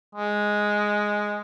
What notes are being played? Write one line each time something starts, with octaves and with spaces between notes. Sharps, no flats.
G#3